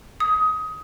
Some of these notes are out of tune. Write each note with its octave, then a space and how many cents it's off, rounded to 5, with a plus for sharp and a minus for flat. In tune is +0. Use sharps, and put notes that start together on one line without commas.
D#6 +20